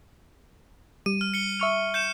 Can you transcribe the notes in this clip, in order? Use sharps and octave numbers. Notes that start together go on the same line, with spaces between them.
G3 D#7
F6
C#7 G7
E5 C#6 F6
G6 C#7 E7